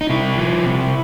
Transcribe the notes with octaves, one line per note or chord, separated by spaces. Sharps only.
D#4
C3 E4
F3
C3